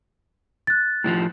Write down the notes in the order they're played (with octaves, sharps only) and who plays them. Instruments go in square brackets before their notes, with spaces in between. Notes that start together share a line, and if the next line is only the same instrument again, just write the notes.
[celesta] F#6 A6
[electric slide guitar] A2 E3 F3